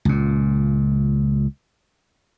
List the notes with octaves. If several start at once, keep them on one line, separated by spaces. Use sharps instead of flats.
C#2 A#2